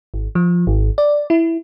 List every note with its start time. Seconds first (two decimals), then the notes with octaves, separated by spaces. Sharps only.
0.14 G#1
0.35 F3
0.67 G#1
0.98 D5
1.30 E4